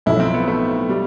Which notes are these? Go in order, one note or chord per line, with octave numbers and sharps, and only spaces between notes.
B1 A2 F3 E4
C4
B3
A3
G3